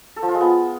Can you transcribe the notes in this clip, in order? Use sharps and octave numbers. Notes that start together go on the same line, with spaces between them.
A4
F3
F4
G#3
B3